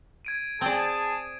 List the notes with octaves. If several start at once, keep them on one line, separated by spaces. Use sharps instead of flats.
G#6 D7 D#7
C4 G#4 D5 A5